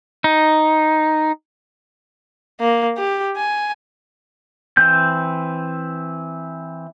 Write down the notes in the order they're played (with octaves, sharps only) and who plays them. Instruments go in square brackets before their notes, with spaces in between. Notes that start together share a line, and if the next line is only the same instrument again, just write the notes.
[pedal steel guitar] D#4
[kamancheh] A#3
G4
G#5
[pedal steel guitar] E3 C4 G6